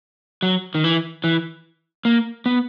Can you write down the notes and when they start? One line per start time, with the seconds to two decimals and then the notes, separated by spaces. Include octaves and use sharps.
0.42 F#3
0.75 D#3
0.84 E3
1.24 E3
2.05 A#3
2.46 B3